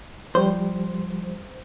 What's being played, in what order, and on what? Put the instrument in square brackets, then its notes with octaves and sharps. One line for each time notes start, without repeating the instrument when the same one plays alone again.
[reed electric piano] F3 G3 [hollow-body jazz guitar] C5